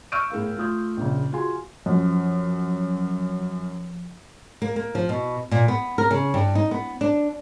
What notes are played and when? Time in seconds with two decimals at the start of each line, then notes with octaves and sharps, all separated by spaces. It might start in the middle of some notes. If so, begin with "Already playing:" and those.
0.12 C#6 E6 F6 G6 D7 D#7
0.30 A2 G#4 A#4 F5
0.57 A3 F4 D#6 G6
0.97 A#1 C#3
1.32 F4 F#4 G#4 G#5 C6
1.86 F#2 F3
4.62 A#3
4.76 A#3
4.95 F3
5.09 B2
5.51 A#2
5.68 B3
5.98 A#4
6.11 C#3
6.34 G2
6.55 D#4
6.71 B3
7.01 D4